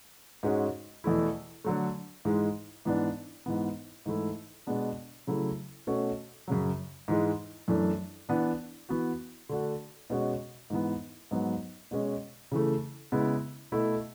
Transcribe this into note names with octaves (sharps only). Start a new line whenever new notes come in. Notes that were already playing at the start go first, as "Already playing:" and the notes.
G#2 G#3 C#4 F#4
E2 B2 A3 E4
D3 F#3 A3
G#2 E3 G#3
G#2 E3 B3 D4
G#2 E3 B3
G#2 E3 A3 E4
B2 G#3 B3 D4
C#3 F#3 A3 E4
B2 A3 C#4 F#4
F#2 C#3 F#3
G#2 E3 G#3
F#2 E3 A3 D4
E3 B3 D4
E3 B3 F#4
D3 A3 D4 F#4
B2 G#3 C#4 F#4
G#2 E3 B3
G#2 F#3 B3
B2 G#3 C#4
C#3 E3 A3
C#3 G#3 B3 E4
B2 A3 E4